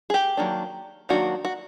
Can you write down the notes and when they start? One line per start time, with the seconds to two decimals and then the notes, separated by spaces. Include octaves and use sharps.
0.10 G#4
0.14 G4
0.37 D#3 F#3 A#3 D4
1.09 D#3 F#3 A#3 D4 F#4
1.45 F#4